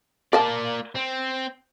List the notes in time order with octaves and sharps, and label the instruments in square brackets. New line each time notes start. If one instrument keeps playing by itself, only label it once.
[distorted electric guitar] A#3 D5 [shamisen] A#4 F5 A5
[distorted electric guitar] C4